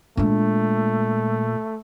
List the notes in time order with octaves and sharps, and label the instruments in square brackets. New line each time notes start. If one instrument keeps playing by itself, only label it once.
[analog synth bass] A#2 [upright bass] G#3 D4 [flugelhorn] A3